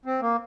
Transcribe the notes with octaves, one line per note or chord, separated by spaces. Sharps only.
C4
A#3